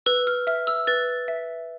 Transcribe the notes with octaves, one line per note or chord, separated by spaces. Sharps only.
B4 E6
F6
E5 F6
E6
B4 A6
E5